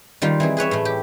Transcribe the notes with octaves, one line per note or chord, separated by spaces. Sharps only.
D#3 G3 F4 F5
E3 C4 G#4
G#4 B4 C#5 E5
A2 A3
G4